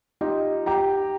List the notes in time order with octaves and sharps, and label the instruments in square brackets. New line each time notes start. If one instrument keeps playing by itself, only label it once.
[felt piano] D#4 F4 G4 D#5
G4 G5 A#5